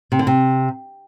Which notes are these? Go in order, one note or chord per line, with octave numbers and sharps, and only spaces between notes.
C3
D3
C3